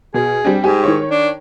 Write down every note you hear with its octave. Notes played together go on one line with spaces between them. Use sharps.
B2 G#4
G3 C4 D4
G#2 G4 G#5
D#3 C#5
D4